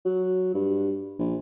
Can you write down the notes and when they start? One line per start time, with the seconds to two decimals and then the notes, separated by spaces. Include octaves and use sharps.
0.05 F#3
0.54 G2
1.19 A#1